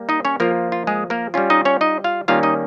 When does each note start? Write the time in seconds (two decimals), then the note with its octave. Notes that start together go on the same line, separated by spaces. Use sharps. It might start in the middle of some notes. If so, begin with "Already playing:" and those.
Already playing: G3 A#3
0.09 D#4 D#5
0.25 C#4 C#5
0.40 F3 A#3 F4 A#4
0.72 F4
0.87 G#3 G#4
1.10 A#3 A#4
1.34 G3 C#4 F4
1.50 D#4 D#5
1.65 C#4 C#5
1.81 D#4 D#5
2.04 F4 F5
2.28 D#3 G3 A#3 C#4 F4 F5
2.43 D#4 D#5